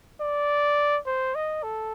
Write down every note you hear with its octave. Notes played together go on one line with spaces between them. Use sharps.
D5
C5
D#5
A4